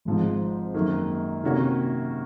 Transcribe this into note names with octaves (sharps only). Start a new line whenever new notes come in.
G#1 G#2 F3
F#2 D#3 A#3
C3 D#3 A#3 C#4 F#4